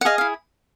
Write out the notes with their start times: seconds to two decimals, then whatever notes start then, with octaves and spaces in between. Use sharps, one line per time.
0.01 F#5
0.05 G#4 D#5 F5
0.18 E4 F5